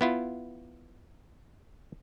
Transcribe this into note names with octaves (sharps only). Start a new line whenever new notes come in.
B3 E4 F4